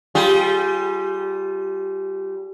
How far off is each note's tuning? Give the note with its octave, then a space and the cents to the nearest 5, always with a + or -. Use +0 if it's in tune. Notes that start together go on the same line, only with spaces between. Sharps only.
G3 -20 F4 +0 G#4 +15